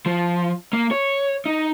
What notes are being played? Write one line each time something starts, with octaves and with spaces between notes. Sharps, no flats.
F3
A#3
C#5
D#4